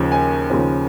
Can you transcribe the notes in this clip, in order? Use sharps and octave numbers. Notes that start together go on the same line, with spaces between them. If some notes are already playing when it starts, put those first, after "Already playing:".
Already playing: D#2 C#3 F3
G#5
D#2 C#3 F3